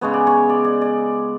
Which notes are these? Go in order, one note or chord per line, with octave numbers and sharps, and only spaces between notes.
C#3 G#3 B3 C#5
D5
C#5
D5
D5
D5